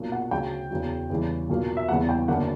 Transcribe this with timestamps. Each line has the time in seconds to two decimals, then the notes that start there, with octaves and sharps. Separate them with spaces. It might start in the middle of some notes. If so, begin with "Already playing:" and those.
Already playing: B1 A#2 F#3 A#3
0.12 F#5
0.31 D2 C#3 F#3 G5
0.71 E2 C#3 F#3
1.10 E2 C#3 E3 G3
1.49 B1 A#2 F#3 A#3
1.77 E5
1.89 E2 C#3 E3 G3 B3 F#5
2.09 G5
2.28 F#1 F#2 D3 F#3 A#3 F#5